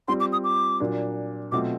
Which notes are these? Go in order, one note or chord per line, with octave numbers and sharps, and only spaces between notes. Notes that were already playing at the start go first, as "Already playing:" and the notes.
G3 C4 F4 C6
D6
D#6
D6
A#2 F#3 A#3 D4
B2 F#3 A3 C4 F4 D6